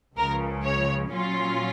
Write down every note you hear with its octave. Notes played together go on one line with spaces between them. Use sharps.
C#2 C#3 F3 A#4
C#5
A#2 F#3 C#4 F4